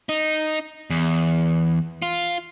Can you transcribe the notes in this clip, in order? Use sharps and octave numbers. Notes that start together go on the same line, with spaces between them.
D#4
E2
F4